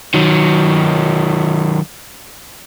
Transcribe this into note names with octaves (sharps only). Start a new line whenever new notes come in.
D#3 F#3